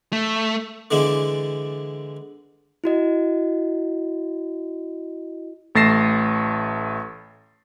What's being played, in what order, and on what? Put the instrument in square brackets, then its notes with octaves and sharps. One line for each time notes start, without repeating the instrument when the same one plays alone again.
[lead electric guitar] A3
[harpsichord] D3 E3 G#3 D4 E4
[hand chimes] E4 F#4 D#5
[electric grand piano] A1 A3 A6 A#6 C7 E7